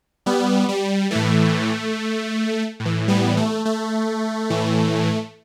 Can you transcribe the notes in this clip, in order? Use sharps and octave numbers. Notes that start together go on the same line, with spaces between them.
G3 B3
G3
A2 E3 A3
A2
E3
G3 B3
A3
A3
A2 E3